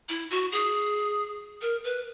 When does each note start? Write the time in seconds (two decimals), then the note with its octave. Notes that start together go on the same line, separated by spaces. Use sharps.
0.09 E4
0.30 F#4
0.52 G#4
1.61 A#4
1.84 B4